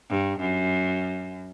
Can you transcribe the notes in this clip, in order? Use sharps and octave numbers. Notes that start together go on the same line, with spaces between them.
G2
F#2